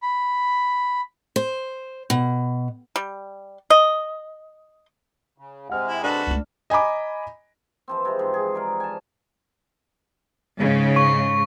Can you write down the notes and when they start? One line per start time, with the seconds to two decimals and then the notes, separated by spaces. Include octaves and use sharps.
0.03 B5
1.36 C5
2.10 B2
2.96 G3
3.70 D#5
5.38 C#3
5.70 C3 G#3 F#5 F6
5.88 E4
6.03 D4 F#4 A4 B4
6.27 C#2 A3
6.70 D#5 G#5 A#5 B5 D6
7.88 E3 F3 C4
8.05 C3 G#3
8.19 G#2
8.34 G#4
8.55 A#4 D5 A#5
8.80 G#5 A5
10.58 G#2 C#3
10.96 C#6